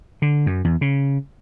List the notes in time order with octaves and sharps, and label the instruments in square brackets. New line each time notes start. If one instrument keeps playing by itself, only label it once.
[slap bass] D3
F#2
E2
C#3